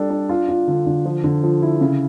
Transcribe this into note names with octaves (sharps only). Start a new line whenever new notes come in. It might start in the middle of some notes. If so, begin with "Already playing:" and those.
Already playing: G3 D4 A4
D4
F4
F4
D3
D3
F3
D3
F3
E4
C#3